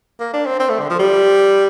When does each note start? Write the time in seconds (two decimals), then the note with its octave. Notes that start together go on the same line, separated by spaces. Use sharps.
0.20 A#3
0.34 D4
0.46 C4
0.60 C4
0.69 A3
0.80 D3
0.90 F3
0.99 G3